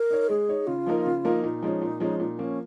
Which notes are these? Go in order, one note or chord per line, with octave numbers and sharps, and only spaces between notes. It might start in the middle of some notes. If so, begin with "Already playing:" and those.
Already playing: A#4
D#4 C#5
G#3 G#4
D#4 C#5
C#3 F4
F3 A#3 D#4 A#4
C#3
F3 A#3 D#4 A#4
A#2 D#4
F3 G#3 C#4
A#2
F3 G#3 C#4
A#2 D#4
F3 A#3 C#4